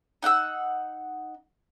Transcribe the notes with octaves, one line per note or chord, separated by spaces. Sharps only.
D#4 F#5 G5 E6